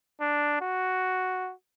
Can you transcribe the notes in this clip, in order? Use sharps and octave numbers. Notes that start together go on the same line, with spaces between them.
D4
F#4